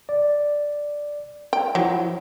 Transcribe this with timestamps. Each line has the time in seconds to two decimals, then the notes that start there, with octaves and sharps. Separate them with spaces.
0.09 D5
1.53 G5
1.75 F3 F#3 E4